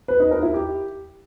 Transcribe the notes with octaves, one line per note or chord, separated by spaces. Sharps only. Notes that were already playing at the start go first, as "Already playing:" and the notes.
B4
D#4
A#4
E4
G4